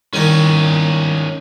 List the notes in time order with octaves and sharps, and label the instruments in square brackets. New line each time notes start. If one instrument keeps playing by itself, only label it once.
[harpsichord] C2 D#3 D5 [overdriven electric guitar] C#4 D#4